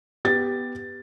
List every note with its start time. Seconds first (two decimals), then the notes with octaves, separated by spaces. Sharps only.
0.25 B3 G4 A6